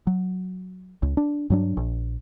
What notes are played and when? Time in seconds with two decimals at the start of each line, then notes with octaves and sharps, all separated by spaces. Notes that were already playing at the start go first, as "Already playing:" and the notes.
0.07 F#3
1.03 C#2
1.17 D4
1.50 G2 F#3 D4
1.77 A#1